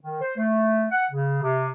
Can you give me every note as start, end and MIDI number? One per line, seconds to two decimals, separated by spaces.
0.01 0.19 51
0.20 0.35 72
0.37 0.86 57
0.91 1.04 78
1.11 1.37 49
1.42 1.69 48